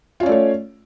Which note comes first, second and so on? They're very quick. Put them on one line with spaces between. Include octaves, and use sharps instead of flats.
F4 C#4 D5 A3 C#5